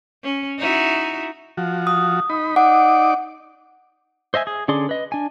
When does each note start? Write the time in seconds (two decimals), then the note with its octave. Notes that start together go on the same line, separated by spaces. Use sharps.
0.23 C#4
0.59 D#4 E4 F#4
1.57 F3 F#4
1.87 D#6
2.30 D#4 B5
2.56 D#4 D5 F#5 D6
4.34 C5 D#5 E5 G#5
4.47 G#4
4.68 D3 C#4 G#4 D5 C6
4.89 B4 D#5
5.12 D4 G#5